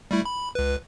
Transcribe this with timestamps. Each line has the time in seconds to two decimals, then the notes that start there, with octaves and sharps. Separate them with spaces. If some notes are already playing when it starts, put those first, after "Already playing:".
0.11 G3 A3 E4
0.25 B5
0.55 C#2 B4